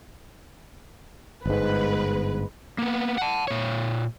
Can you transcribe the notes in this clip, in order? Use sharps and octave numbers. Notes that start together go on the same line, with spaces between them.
G1 G#2 G#3 B4
A#3 B3
F#5 A5
A#2 C#5